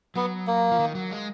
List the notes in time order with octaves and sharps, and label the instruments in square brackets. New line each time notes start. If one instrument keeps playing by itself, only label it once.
[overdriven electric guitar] F#3 [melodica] B3
[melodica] A#3
[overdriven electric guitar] F3
D#3
F#3
G#3